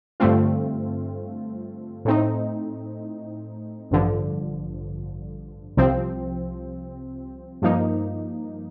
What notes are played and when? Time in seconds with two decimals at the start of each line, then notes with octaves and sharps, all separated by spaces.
0.20 G2 D3 A3 C4 F4
2.05 A2 A3 C4 D#4
3.91 A1 G2 D3 F3
5.77 C2 C3 F3 C4
7.62 G2 F3 A#3 D#4